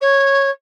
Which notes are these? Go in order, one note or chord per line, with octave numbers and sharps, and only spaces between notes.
C#5